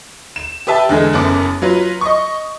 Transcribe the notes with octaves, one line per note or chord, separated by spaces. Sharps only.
E7
G4 B4 E5 A5
E2 D3 G#3
F#1 F#2 B3 D6
F#3 F4 B4
D#5 C#6